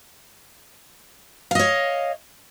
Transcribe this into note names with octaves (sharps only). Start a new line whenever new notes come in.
C#5 D#5 F5